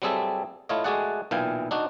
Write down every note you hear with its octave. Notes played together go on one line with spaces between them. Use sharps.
F#3 G3 C4 G#4 A4 E5
A3 E4 F4 C#5 D#5
G#3 A3 F#4 G#4 D5 F#5
B1 A#2 E3 F5 G5 G#5
D4 D#4 F#4